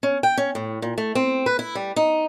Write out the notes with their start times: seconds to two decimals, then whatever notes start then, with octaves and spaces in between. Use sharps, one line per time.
0.03 C#4
0.23 G5
0.37 C#4
0.55 A2
0.82 A#2
0.98 A3
1.15 C4
1.46 B4
1.59 E4
1.75 G3
1.96 D#4